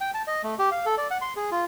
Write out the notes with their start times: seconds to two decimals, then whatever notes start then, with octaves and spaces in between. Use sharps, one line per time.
0.01 G5
0.14 A5
0.27 D#5
0.44 A3
0.59 G4
0.72 F5
0.86 A4
0.98 D5
1.11 F#5
1.22 C6
1.36 G#4
1.51 F4